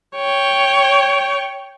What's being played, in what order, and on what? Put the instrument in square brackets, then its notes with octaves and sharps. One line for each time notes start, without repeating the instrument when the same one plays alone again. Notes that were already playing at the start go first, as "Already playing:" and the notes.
[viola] C#5 G5